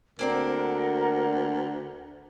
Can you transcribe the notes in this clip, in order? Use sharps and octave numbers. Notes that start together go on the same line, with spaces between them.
D2 A#3 C4 D4 A#4 F#5